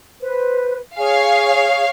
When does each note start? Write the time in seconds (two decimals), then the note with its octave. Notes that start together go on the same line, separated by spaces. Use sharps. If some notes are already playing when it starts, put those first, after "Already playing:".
0.20 B4 C5
0.96 G#4 C#5 F5 G#5